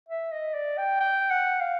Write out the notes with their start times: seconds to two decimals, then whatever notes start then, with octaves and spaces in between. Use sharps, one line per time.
0.09 E5
0.32 D#5
0.54 D5
0.78 G5
1.00 G5
1.30 F#5
1.61 F5